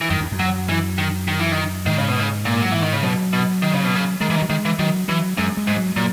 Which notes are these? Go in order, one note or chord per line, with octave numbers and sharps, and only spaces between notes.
E3
F#2 D#3
E2
F#2
F#3
E3
D#3
D#3
E3
D#3
G#2 D#3
C#3
B2
C#3
A#2
F#3
E3
D#3
C#3
B2 F#3
B2
D#3
C#3
B2
C#3
D#3 G#3
E3
D#3
F#3
D#3 G#3
E3
D#3 F#3
E3 F#3
F#2 G#3
G#3
G#2
F#3
A#2 F#3